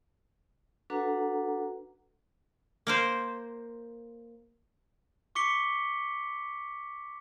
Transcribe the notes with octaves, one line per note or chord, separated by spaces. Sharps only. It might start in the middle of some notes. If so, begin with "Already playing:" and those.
D4 F#4 A4 B4 F#5 A#5
A#3 A#4 C5
C#6 D6 B6 C#7 G7